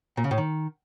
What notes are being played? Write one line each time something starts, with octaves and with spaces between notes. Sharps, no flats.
A#2
C#3
A2
D#3